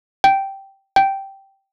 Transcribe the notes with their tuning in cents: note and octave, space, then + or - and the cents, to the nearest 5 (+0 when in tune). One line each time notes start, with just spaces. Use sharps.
G5 -5
G5 -5